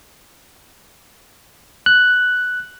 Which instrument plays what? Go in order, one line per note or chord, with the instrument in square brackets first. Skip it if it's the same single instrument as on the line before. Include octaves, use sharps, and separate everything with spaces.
[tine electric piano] F#6